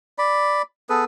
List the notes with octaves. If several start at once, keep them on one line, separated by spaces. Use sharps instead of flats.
D5 B5
B3 G#4 A4 B4